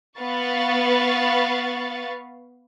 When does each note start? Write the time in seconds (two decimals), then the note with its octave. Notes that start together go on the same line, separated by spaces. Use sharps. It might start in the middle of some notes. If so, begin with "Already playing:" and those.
0.19 B3 B4 F5 C#6 A6